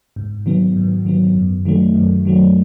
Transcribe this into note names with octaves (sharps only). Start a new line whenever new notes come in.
G#2
D#3 F#3 B3
G#2
D#3 F#3 B3
F#2
D#3 F#3 A3
F#2
D#3 F#3 A3